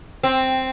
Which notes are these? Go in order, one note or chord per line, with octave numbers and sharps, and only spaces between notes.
C4